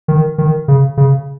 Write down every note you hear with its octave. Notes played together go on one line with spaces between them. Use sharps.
D#3
D#3
C#3
C#3